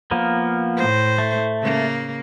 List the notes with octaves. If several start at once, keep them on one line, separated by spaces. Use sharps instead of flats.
F3 A#3 B3
A2 C5
A3
C#3 A#3